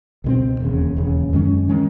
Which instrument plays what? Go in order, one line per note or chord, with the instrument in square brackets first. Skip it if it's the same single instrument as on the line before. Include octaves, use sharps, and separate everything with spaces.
[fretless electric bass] C#2 B2 G#3 C4
E1 D#2 C#3
E1 D#2 C#3
F#2 D#3 G#3 C#4
D#3 G#3 C#4